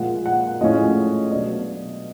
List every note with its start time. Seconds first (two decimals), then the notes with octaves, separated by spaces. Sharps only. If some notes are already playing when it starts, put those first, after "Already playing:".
Already playing: A#2 F3 G#3 F#5
0.26 F#5
0.61 A2 F3 G#3 C#4 D#5
1.31 B2 F#3 B3 D4 D#5